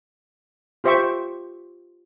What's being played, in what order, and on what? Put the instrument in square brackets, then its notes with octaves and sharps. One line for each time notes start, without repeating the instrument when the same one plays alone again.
[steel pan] F4 G4 C5 E5 G5 C#6